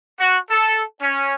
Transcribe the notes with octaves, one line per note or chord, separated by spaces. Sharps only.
F#4
A4
C#4